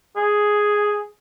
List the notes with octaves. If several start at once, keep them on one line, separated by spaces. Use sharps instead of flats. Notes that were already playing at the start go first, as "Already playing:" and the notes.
G#4